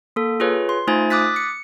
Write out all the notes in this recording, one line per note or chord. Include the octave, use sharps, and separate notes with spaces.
A#3 A4
F4 G#4 B4 C#5
C6
A3 D#4 F4 C5 G#5 A6
D6 D#6 F#6 A6 B6
C#7